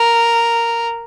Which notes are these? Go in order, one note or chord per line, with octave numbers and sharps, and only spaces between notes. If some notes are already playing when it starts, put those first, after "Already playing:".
Already playing: A#4